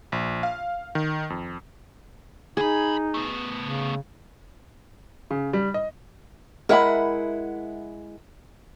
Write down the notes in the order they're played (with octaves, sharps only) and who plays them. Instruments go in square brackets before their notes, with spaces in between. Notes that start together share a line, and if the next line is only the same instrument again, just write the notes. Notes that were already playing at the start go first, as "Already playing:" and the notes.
[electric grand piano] A#1
F5
D#3
F2
[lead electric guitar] C2 B5 [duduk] D#4 [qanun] G#4
[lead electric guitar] A3 B3
[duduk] C#3
[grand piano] C#3
G3
D#5
[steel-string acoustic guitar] G#3 E4 F#5 [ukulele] A#4 E5 B5